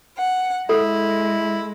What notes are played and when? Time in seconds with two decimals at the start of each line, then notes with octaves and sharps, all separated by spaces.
0.18 F#5
0.69 G#3 E4 A4